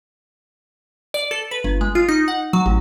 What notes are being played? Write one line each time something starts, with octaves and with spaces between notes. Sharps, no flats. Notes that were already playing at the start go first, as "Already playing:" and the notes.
D5
A4
B4
G1
G#3
F4
D#4
F#5
F#3
A1